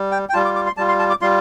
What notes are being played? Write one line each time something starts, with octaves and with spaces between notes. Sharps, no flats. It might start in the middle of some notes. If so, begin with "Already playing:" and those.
Already playing: G3
G5
G5
G3 F4 A5
D6
D6
C6
G3 F4 A5
C6
A5
D6
G3 F4 C6